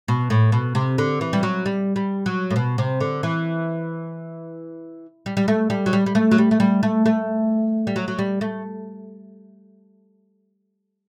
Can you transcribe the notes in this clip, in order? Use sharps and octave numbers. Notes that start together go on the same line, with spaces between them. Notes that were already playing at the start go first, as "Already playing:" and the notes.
B2
A2
B2
C3
D3
E3
G3
F#3
G3
G3
F#3
A2
B2
C3
D3
E3
G3
G3
A3
G3
F#3
G3
G3
A3
F#3
G3
A3
G3
A3
A3
G3
F#3
F#3
G3
A3